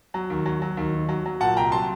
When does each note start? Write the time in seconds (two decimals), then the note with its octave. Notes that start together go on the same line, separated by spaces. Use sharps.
0.14 F#3
0.30 D#2
0.46 F#3
0.62 F#3
0.77 D#2
0.93 D#3
1.09 F#3
1.26 F#3
1.40 A#2 F#5 A5
1.57 C2 G5 A#5
1.72 F#3 A5 C6